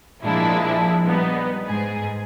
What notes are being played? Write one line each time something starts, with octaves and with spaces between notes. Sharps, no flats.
A#2 F3 G#3 D4 E4
G3 B3 D#4
G#2 G#4